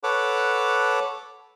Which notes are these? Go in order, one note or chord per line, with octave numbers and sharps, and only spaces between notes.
A4 B4 C#5 F#5 D6